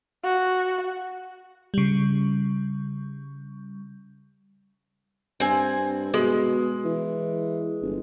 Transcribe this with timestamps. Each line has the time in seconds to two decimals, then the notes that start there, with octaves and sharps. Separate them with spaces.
0.24 F#4
1.74 C#3 G3
5.40 G2 C4 G#5
6.14 B2 G#3
6.85 E3
7.82 G1